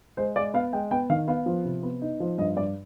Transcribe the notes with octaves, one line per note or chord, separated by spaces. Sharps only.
G#3 C5
G#3 D5
B3 F5
G#3 G5
B3 G5
D#3 F5
B3 F5
F3
C3
B3
D#4
F3
G2 D#5
G2 D5